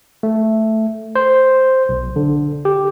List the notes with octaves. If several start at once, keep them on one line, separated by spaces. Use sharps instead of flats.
A3
C5
B1
D3
G4